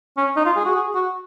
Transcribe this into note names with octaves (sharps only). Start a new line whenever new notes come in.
C#4
D#4
F4
G#4
F#4
G#4
F#4